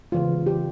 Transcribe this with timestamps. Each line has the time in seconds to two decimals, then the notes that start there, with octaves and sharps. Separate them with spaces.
0.12 C#3 E3 G#3 F4
0.46 G4